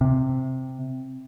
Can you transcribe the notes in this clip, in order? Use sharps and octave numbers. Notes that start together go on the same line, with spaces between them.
C3